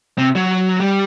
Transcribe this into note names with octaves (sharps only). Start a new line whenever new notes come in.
C3
F#3
G3